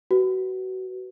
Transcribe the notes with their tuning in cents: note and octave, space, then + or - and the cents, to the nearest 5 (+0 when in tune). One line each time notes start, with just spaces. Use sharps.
F#4 +25 B4 +0